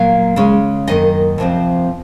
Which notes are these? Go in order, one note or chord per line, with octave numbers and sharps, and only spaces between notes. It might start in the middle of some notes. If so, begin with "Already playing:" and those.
Already playing: A#2 F#3 A#3 F5
C#3 G#3 C#4
F#2 D#3 A#3 D#5
F2 C3 F3 C4